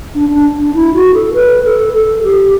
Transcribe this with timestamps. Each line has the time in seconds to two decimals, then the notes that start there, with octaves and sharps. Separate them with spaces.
0.15 D4
0.30 D4
0.59 D4
0.75 E4
0.94 F#4
1.14 A4
1.34 B4
1.64 A4
1.94 A4
2.24 G4